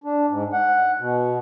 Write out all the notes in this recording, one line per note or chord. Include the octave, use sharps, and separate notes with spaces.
D4
G#2
F#5
B2